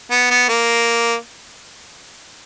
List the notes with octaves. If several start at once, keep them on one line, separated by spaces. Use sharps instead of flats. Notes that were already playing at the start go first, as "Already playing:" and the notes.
B3
B3
A#3